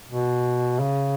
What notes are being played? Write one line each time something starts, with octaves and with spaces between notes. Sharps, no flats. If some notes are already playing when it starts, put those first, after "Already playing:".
B2
C#3